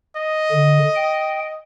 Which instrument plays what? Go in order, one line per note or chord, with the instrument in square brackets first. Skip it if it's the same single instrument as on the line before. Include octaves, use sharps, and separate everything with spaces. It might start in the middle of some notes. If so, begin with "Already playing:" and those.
[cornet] D#5
[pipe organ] D3
G5